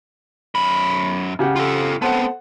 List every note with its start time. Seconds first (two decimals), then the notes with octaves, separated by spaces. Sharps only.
0.55 F#2 B5
1.39 C#3 G4 F#5
1.56 F4 A4
2.02 B3 C4 A4 C5 F#5